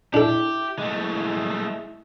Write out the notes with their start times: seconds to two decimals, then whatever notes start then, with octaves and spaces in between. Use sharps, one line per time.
0.14 D4 E4 G4 A4
0.79 G#3 A3